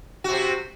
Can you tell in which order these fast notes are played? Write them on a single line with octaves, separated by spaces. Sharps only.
F#4 C3 C4